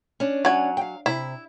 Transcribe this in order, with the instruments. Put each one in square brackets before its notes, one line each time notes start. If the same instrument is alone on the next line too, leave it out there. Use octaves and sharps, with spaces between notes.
[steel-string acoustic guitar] C#4 D4
[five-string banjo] F#3 G#5
[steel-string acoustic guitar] F5 G5
[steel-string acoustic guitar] C3 [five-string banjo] E4